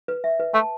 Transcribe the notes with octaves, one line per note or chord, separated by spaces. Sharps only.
B4
E5
B4
A3 A5